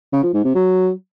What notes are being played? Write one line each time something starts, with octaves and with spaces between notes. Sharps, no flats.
C#3
F3
G#2
C3
F#3